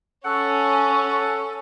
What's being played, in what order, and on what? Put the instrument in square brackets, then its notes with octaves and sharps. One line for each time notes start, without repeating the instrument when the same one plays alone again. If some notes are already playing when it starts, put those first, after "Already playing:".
[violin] C#4 [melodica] A4 [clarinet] F#5 [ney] C#6